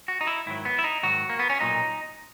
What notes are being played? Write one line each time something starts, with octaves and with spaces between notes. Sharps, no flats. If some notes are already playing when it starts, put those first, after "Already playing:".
F#4
D#4
E4
G#2 D#3 F#3 E4
B3
E4
D#4
G#2 D#3 F#3 F#4
A#3
B3
C#4
B1 A#2 F#3 D#4